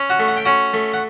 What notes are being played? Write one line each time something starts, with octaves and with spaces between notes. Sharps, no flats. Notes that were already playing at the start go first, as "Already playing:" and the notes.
Already playing: C#4
F#4 F#5
A3
F#5
G5
C#4 F#4 F#5
A3
F#5